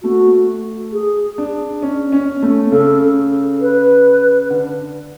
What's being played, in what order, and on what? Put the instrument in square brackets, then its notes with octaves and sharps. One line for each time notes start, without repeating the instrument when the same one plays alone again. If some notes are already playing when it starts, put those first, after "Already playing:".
[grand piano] A3 [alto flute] F#4
[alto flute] G#4
[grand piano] D4
C#4
C#4
A3
[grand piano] C#3 [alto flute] A4
[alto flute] B4
[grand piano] D3